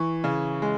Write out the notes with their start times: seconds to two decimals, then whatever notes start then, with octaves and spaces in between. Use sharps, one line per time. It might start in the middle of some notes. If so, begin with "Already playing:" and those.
Already playing: E3 C#6
0.24 C#3
0.62 G#3